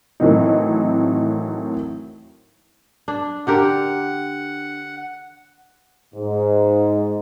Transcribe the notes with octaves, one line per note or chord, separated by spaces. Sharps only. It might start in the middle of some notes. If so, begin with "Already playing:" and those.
A2 D#3 E3 F#3 C4 D#4
D4
D3 G4 A#4 F#5
G#2